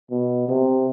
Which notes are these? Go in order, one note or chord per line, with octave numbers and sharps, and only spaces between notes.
B2
C3